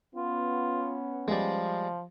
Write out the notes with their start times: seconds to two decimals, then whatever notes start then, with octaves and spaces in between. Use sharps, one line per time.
0.15 B3 C#4 F4
1.28 F3 G3 G#3